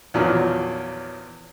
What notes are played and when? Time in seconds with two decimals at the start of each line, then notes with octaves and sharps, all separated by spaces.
0.14 E2 A#2 D#3 F3 F#3